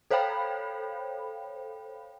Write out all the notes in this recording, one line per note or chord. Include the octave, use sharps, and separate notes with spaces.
A4 C5 C#5 F5 G5 B5